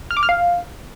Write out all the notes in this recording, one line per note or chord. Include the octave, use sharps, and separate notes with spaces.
F6
D6
F6
F5